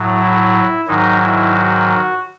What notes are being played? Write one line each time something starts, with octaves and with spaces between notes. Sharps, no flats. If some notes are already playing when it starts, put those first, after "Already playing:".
Already playing: A2 F#3
E4
G#2 D#3 F#3 D#4
E4
F#4